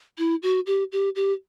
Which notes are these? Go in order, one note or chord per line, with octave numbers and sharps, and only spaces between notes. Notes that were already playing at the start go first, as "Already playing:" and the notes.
E4
F#4
G4
G4
G4